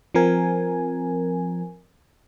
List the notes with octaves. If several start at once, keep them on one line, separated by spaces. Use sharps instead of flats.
F3 C4 A#4 G#5